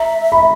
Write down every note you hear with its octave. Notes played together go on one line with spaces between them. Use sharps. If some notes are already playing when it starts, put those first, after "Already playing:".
Already playing: E5 A#5
B5